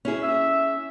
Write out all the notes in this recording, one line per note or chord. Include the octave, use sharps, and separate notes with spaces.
C#4 E4 G#4
E5